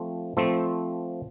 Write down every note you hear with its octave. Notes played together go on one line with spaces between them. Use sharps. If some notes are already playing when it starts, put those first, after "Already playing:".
Already playing: F3 A3 C4
F3 A3 C4